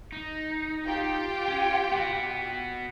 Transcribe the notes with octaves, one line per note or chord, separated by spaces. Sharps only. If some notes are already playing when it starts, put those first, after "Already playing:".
D#4
F4 G4 G5
C#4
B3 F#4